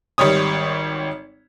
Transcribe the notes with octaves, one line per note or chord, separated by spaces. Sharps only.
G#1 G3 G4 C#5 D#6